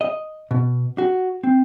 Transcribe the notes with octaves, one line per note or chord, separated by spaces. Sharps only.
D#5
B2
F#4
C4